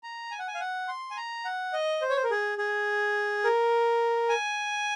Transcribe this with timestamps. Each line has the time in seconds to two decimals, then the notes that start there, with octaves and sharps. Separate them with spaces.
0.03 A#5
0.31 G#5
0.39 F#5
0.48 G#5
0.55 F5
0.60 F#5
0.88 C6
1.11 G#5
1.17 A#5
1.45 F#5
1.73 D#5
2.02 C5
2.10 C#5
2.17 C5
2.24 A#4
2.31 G#4
2.58 G#4
3.44 A#4
4.29 G#5